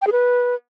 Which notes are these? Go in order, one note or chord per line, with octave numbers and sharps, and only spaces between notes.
G5
G#4
B4